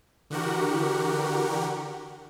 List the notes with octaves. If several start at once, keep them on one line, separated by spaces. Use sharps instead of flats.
D3 E3 F#4 G4 A#4 F#5